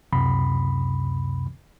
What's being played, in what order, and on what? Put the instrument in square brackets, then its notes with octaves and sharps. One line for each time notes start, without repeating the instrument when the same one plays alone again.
[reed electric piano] C#2 F#2 C3 B5